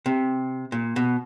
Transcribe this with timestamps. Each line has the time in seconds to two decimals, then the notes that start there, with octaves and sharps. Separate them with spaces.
0.06 C3
0.72 A#2
0.96 B2